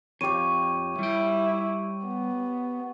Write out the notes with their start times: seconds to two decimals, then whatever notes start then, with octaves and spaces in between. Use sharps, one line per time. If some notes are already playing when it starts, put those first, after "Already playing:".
0.21 F2 G4 C#5 C#6 D#7
0.99 G3 E4 G5
2.06 B3